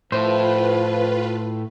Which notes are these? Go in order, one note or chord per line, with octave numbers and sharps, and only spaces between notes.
A2 F3 E4 F4 B4 C5